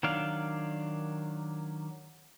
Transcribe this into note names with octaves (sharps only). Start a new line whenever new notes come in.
D#3 F#3 D4 F5